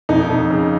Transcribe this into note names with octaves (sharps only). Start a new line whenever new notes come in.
F2 D#4
F2
C#3